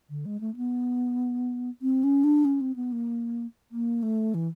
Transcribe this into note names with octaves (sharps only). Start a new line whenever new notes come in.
D3
G#3
A3
B3
C4
C#4
D4
C#4
C4
B3
A#3
A#3
A3
E3